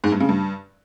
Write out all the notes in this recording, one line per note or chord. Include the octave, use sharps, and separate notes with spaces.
G#2
G2
C#3
G2